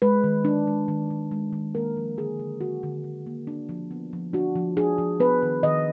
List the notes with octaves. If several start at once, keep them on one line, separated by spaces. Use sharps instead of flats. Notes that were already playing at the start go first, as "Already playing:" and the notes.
G#3 B4
D#3
D4
G#3
D#3
D#3
G#3
D#3
A#3 A#4
F3
D3 G#4
D3
D3 F#4
D3
D3
A#3
D4
F3
B3
F3
D4 F#4
F3
D4 G#4
F3
B3 B4
D#3
D#3 D#5